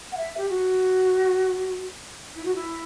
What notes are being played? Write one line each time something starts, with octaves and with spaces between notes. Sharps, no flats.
F#5
E5
G4
F#4
E4
F#4
E4